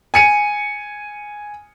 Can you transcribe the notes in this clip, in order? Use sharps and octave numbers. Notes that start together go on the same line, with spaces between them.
G#5 C#7 D#7